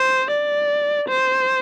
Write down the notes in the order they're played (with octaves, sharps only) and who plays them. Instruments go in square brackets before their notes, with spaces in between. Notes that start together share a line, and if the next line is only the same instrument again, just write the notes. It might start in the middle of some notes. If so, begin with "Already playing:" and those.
Already playing: [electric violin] C5
D5
C5